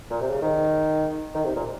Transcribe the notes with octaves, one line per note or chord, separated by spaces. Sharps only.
A#2
C3
C#3
D#3
D#3
C3
A#2